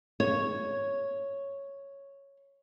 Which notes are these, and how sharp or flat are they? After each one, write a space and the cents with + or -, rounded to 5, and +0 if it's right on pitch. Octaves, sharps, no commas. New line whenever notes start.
C#5 +0